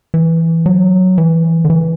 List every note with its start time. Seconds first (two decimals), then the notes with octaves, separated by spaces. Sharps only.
0.14 E3
0.66 F#3
1.18 E3
1.65 D3
1.70 E3